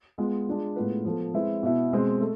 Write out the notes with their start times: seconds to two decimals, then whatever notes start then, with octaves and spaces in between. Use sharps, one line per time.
0.18 G#3 B3 F4
0.47 G#3 D4 F4
0.76 A2 G#3 B3 F4 B4
1.05 F3 B3 F4 A4
1.34 G#3 C4 E4 B4
1.63 B2 B3 E4
1.92 B2 G#3 C4
2.21 A3